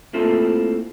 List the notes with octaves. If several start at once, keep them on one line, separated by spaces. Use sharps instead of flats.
A3 A#3 C4 E4 F4 A4